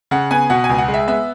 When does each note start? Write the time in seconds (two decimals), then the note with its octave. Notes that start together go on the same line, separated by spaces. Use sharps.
0.11 C#3 F#5
0.31 B3 G#5
0.50 B2 F#5
0.64 G#5
0.69 C#2
0.78 F#5
0.88 G#3
0.94 E5
1.08 B3 E5